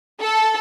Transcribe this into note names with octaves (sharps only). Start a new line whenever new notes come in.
A4